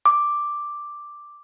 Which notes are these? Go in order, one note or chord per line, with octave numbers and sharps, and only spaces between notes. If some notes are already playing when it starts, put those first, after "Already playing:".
D6